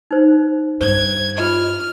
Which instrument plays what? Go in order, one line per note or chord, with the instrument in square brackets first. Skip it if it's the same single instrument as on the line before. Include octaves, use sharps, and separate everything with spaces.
[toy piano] D#4 C5
[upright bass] G2 [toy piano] C5 [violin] G#6
[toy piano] F4 D#5 [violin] F6